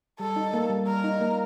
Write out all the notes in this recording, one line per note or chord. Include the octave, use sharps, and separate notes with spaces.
G3 A4
D#4
A#3
G3
G3 A#4
D#4
A#3